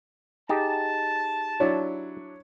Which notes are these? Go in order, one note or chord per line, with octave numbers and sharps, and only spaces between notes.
D#4 G4 G#4 A5
F#3 D4 E4 C#5